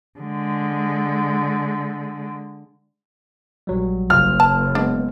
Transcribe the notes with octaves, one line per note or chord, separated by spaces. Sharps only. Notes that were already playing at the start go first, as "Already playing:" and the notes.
D3 G#3
A#1 F#3 G3
F#1 F4 F6
A5
G#3 B3 D4